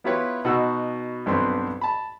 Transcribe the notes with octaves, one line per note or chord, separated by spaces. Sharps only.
B3 E4 F4 G4 B4 C#5
B2 D#4 F#4 F#5 E6 F#6
B1 G2 B3 C4 C6
A5 B5